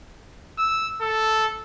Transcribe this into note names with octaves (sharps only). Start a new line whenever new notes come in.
E6
A4